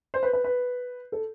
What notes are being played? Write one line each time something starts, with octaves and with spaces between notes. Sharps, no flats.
C5
B4
B4
B4
A4